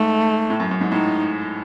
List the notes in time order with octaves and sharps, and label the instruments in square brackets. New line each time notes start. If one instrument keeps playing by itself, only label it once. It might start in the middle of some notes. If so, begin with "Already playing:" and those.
Already playing: [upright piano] G#2 [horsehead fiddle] A3
[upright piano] A2
F#2
F#2
G#2
[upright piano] A2 [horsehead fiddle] D#4